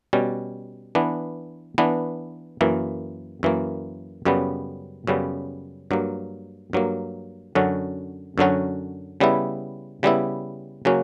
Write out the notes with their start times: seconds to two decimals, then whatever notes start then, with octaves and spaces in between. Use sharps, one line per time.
0.13 B2 G3 C#4
0.95 E3 B3 D4
1.78 E3 B3 D4
2.61 F#2 E3 A#3
3.43 F#2 E3 A#3
4.25 F#2 C#3 G3 B3
5.07 F#2 C#3 G3 B3
5.91 G2 F#3 A#3
6.73 G2 F#3 A#3
7.55 F#2 D3 F#3 C#4 F#4
8.38 F#2 D3 F#3 C#4 F#4
9.20 C#3 G3 B3 E4
10.03 C#3 G3 B3 E4
10.85 C#3 F#3 A#3 C#4 F#4